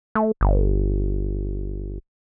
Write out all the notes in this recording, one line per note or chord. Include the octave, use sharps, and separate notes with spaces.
A3
G1